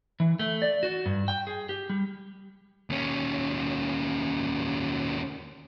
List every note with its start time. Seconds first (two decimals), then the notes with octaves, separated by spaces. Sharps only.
0.20 E3
0.39 A3
0.62 D5
0.83 F#4
1.06 G2
1.28 G5
1.47 G#4
1.69 G4
1.90 G3
2.90 D#2 C#4